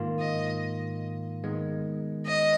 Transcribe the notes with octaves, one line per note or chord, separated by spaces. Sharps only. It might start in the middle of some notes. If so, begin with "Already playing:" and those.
Already playing: G#2 D#3 A#3 F4
D#5
D#3 G#3 B3
D#5